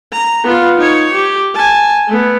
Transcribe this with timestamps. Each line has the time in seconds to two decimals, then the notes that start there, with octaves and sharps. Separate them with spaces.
0.12 A#5
0.44 B3 F4
0.77 D#4 C#5
1.12 G4
1.54 G#5 A5
2.08 A3 B3